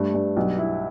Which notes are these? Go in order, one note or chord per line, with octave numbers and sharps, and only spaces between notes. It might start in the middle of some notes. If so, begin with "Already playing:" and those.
Already playing: G2 A3
G2
B1
E4